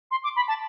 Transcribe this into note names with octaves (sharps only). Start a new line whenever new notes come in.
C6
D6
B5
A5